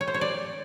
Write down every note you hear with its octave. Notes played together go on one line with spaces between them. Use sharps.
C#5
C5
C#5
D5